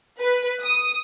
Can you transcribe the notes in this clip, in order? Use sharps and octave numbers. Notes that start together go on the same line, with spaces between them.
B4
D#6